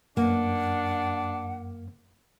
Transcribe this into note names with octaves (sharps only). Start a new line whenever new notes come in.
F#2 A#3 D4 F#5